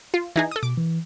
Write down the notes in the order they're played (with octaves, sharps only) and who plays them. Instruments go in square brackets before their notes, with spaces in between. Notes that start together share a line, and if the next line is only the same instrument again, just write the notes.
[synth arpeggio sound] F4
E3 D#4 G#4
A4 D#6
[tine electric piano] B2 [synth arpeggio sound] D6
[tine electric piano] E3